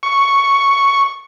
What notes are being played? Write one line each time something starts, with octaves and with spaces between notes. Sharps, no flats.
C#6